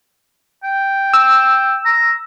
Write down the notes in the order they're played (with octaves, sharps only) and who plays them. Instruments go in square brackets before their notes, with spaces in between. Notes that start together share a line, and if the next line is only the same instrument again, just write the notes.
[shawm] G5
[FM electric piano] E6
[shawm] A#5